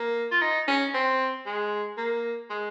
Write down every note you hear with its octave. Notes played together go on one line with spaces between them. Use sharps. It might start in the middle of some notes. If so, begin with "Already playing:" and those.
Already playing: A#3
F4
D#4
C#4
C4
G#3
A#3
G#3